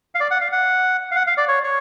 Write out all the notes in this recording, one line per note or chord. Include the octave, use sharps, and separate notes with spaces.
F5
D5
F#5
F5
F#5
F5
F#5
F5
D5
C#5
C#5